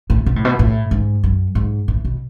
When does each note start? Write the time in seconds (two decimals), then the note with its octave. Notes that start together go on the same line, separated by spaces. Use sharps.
0.10 A2
0.26 B2
0.36 A2
0.45 B2
0.59 A2
0.91 G#2
1.23 F#2
1.55 G#2
1.88 A2
2.05 B2